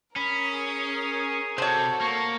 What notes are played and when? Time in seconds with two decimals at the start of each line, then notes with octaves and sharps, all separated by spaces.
0.16 C#4 A#4 B5 D#6
0.53 G#4
1.58 C3 F#4 A4 C5 C#5
2.01 A#3 C#6